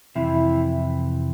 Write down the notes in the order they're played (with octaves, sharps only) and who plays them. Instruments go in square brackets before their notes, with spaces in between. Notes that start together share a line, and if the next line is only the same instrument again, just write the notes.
[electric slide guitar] F2 C3 E3 [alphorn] E4